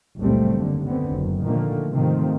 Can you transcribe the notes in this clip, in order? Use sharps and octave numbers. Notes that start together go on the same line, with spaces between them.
F#1 C#2 A#2 G3 A3 C4
D#2 D3
D3 B3 C4
F#1 F#2
A#2 D3 D#3 F3 A3 A#3
G#2 C3 D#3 F3 A3 C4